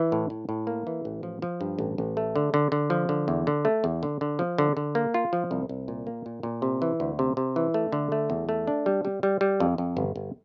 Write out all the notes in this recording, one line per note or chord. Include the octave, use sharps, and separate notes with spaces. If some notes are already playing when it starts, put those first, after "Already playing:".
Already playing: E3
A2
A2
A2
A#3
E3
A1
F3
F3
G2
A1
A1
A3
D3
D3
D3
F3
D3
E2
D3
A3
E2
D3
D3
F3
D3
D3
A#3
F4
F3
C2
C2
A#2
A#3
A#2
A#2
C3
E3
D2
C3
C3
E3
A3
D3
A3
E2
A3
D4
G3
G3
G3
G3
F2
F2
G1
G1